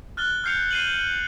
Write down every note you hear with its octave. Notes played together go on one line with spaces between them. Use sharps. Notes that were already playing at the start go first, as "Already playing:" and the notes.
F6 F#6 A6 G7
F6 G6 C7 C#7 F7
C7 D#7 F#7